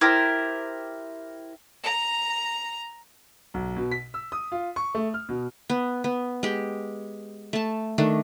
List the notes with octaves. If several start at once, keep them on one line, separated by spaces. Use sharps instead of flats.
E4 G4 A#4 C5
A#5
B1
B2
B6
E6
D#6
F4
C#6
A3
F6
B2
B3
B3
G#3 G4
A3 A5
D#3 A3 D4